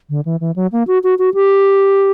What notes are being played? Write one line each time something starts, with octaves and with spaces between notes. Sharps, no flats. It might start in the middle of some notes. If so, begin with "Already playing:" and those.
D3
E3
E3
F#3
A#3
F#4
F#4
F#4
G4